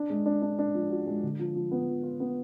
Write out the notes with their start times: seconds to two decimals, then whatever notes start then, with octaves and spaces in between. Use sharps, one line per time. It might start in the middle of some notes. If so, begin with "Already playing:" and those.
Already playing: D4
0.10 G#3
0.26 D4
0.42 D4
0.59 D4
0.74 F3
0.90 F#4
1.07 G#3
1.23 D3
1.39 F3
1.55 F3
1.71 B3
1.88 F3
2.03 F4
2.20 B3